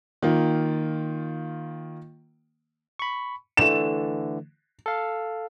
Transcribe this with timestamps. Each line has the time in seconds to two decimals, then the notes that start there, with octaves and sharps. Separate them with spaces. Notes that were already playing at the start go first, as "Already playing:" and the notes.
0.22 D#3 A#3 F4
2.99 B5 C#6
3.57 D3 E3 A3 E7
4.86 A4 F5